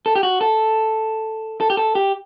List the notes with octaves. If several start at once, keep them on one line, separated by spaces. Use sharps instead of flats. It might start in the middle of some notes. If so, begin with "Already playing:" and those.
A4
G4
F#4
A4
A4
G4
A4
G4